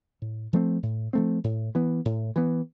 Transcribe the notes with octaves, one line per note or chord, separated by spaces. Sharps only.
A2
F3 A3 C4
A2
F3 A3 C4
A2
E3 B3
A2
E3 B3